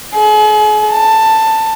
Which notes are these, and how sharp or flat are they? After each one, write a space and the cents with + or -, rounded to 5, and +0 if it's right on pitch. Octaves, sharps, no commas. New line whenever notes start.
G#4 +40
A5 +15